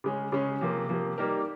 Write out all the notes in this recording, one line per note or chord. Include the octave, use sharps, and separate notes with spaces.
C#3 G#3 C#4
C#3 G#3 C#4
C3 F3 A#3
C3 F3 A#3
G3 A#3 D#4 G4 A#4